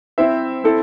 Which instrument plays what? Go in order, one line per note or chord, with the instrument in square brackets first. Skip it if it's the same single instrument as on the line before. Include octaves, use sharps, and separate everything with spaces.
[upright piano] C4 E4 C5 E5
C4 E4 A4